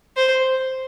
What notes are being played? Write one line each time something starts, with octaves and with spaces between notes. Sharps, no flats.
C5